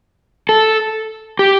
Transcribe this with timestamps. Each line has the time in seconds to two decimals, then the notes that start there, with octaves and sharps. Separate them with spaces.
0.49 A4
1.39 G4